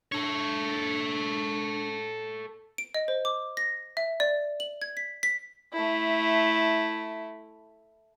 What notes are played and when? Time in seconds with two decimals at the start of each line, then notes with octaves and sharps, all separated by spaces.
0.12 D4 A4 C#5
2.78 D7
2.94 D#5
3.08 C5
3.25 D6
3.57 A#6
3.97 E5
4.20 D5
4.60 F#7
4.82 G#6
4.97 B6
5.23 B6
5.73 A3 E4